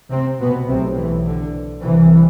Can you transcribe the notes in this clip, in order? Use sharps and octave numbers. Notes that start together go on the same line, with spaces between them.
C3 C4
B2 B3
B1 A2 C3 C4
E3
D3
C2 C3 E3